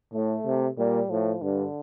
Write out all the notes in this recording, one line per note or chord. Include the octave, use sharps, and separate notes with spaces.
A2 A3
C3
A#2 G3
A2 F3
G2 D3